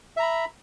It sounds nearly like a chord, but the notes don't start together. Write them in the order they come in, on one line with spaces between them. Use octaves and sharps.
E5 A#5 B5